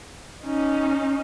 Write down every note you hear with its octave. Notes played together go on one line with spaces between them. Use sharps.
C#4 D#4